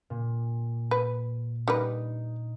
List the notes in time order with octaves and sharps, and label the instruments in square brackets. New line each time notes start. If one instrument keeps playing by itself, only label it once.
[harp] A#2
[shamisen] B4
[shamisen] G3 A#4 B4 [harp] D#4